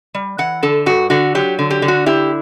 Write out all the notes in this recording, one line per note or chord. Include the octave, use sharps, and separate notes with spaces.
G3
E3 F#5
D3 A4
G2 F#4
D3 F#4
F#3 G4
D3
G4
D3
F#4
E4 G4